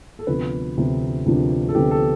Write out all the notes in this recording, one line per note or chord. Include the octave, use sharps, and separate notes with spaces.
A4
D2 C3 F3 B3 D4 B4
D2 C3 F3 B3 D4
D2 C3 F3 B3 D4
A4
D2 C3 F3 B3 D4 G4
A4